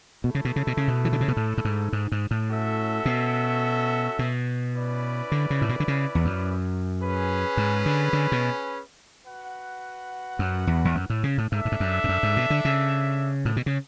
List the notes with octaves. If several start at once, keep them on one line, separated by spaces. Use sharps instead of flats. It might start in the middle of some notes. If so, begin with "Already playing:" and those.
B2 A3 E4 A4
C#3
B2
C#3
B2
C#3
B2
E3
D3
C#3
B2
A2
A2
G#2
G#2
G#2
A2
C#4 F#4 A4 E5
B2
B2
C#4 E4 B4 D5
D3
C#3
A2
B2
D3
C#3
E2
F#2
C#4 G#4 B4
G#2
D3
D3
B2
F#4 B4 F#5
F#2
E2
E2
F#2
A2
C#3
A2
G#2 D4 A4 E5
A2
G#2
F#2
G#2
F#2
G#2
B2
D3
C#3
A2
B2
C#3